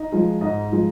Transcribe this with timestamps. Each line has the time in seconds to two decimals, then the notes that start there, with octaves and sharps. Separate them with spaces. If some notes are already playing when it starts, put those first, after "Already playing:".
Already playing: D#4 D#5
0.12 F3 G#3
0.41 G#2 D#4 D#5
0.72 F3 G#3